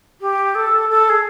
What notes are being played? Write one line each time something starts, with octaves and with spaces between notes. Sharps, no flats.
G4
A4
A4
G#4